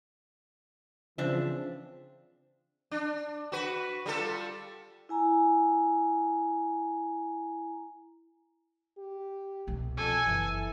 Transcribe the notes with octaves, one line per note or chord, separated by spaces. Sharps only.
C#3 E3 F3 C4 D4 E5
D4
F#4 B4
G3 F4 A4
E4 G#5 A#5
G4
C2 B2
F2 A4 G#5
F#1 E3